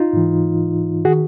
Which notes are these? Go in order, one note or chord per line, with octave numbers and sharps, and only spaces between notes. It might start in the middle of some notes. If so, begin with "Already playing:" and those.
Already playing: D#4 F4
G#2 E3
D#3 F#4 G#4